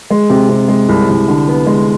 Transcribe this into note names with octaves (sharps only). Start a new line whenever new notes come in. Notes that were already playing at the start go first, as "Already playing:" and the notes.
G#3
C3
C3
G#3
C2
C2
D3
B3
G#3